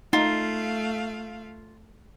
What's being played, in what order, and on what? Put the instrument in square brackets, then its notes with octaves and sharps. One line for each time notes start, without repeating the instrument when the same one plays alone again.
[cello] A3 F5 [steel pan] D#4 [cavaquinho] F4